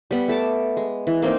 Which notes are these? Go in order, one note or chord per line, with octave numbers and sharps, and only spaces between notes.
G3 B3
A3 A4 A5 D6
G#3
E3
A#3 C4 D#4